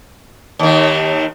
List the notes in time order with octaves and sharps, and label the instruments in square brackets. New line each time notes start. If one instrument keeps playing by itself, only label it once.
[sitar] D#2 D#3